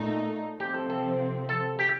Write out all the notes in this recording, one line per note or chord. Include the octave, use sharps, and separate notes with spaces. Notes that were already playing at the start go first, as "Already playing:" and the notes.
Already playing: A#2 A3 D#4
C3 F3 C4 G4
A4
A4
A4
G4